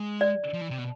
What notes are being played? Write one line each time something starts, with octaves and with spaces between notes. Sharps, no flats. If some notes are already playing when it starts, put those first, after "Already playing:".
Already playing: G#3
D5
F3
E3
C3
B2